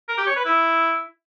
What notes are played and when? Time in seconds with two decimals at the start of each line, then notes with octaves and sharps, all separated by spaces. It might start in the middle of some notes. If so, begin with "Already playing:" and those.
0.08 A#4
0.18 G4
0.27 C#5
0.36 B4
0.45 E4